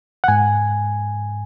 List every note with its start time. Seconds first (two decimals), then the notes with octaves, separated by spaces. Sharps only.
0.24 F#5
0.28 G#2 G#5